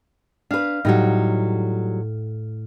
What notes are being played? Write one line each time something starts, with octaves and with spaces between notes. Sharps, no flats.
D4 B4 F5
A2 F#3 G3 D#4